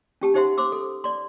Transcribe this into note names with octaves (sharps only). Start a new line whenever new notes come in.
C#4 G4 A5
D#4 G4 C5 E5 F#5 C6
C5 C6 D6 E6
A4
D5 C6